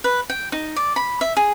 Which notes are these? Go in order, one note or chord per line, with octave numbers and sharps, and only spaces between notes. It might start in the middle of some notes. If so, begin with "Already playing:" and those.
B4
G5
D#4
D5
B5
E5
G#4